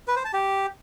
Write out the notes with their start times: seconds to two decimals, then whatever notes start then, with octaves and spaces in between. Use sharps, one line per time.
0.08 B4
0.16 C5
0.25 A5
0.33 G4